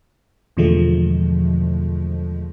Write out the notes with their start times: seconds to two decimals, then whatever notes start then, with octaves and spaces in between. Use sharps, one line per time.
0.57 E2 B2 D3 F3 G#3 A3